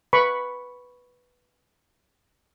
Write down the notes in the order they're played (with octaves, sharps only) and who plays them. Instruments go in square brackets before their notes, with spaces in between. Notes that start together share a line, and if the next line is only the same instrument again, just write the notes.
[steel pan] B4 B5 C#6